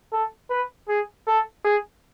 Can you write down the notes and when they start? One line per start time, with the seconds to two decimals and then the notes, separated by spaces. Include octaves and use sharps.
0.12 A4
0.50 B4
0.88 G#4
1.27 A4
1.65 G#4